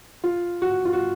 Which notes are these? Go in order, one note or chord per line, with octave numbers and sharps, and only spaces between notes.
F4
F#4
F4
F#4